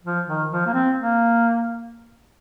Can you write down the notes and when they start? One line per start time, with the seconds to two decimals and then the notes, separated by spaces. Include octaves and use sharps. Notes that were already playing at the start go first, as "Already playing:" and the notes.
0.04 F3
0.27 D#3
0.51 F3
0.66 A#3
0.74 C4
0.98 A#3